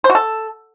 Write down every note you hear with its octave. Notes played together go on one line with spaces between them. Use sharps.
C5
F#4
A4